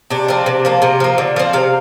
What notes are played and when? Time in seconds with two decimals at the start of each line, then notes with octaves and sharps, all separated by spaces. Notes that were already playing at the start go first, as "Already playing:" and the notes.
0.10 C3 D4
0.28 F3 C4
0.46 C3
0.65 F3 A#3
0.82 C3 F4
1.00 F3 A#3
1.18 D3
1.36 F3 C4
1.53 C3 F5